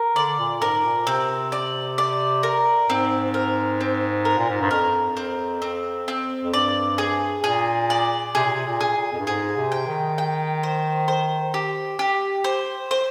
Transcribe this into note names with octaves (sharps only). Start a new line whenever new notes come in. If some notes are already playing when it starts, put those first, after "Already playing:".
Already playing: A#4
D3 D5
A#2
G#2 A#4
A#2
C3 C4
D5
D5
A#4
G#2 C4
A#4
C4
A#4
A#2
G#2
G2
F2 A#4
C4
C4
C4
F2
G2 D5
G#4
A#2 G#4
D5
C3 G#4
A#2
C3
A#2
G#4
A#2
F2
G2
G#2 G#4
C3
G5
D#3
G5
C5
C5
G4
G4
C5
C5